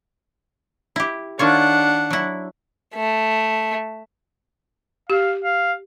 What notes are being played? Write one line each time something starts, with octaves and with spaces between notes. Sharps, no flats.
E4 G4
D#3 D4 F4 C#5 F#5
F#3 E4
A3
G4 F5
F5